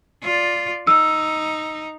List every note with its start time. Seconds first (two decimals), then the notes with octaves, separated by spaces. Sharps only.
0.22 F4 D5
0.87 D#4 E6